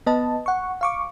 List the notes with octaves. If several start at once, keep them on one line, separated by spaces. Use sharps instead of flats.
B3 B4 D#5 A5
F#5 C#6
F5 C#6 D6